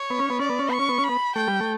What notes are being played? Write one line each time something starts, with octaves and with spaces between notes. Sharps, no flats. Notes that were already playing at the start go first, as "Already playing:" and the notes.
Already playing: C#5
B3
C#4
B3
C#4 D5
B3
C#4
B3 C#6
C#4
B3
C#4
B5
B3
A3 G5
G3
A3